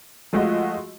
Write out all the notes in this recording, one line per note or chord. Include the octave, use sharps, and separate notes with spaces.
F3 G#3 A3 F4 F#4 D#5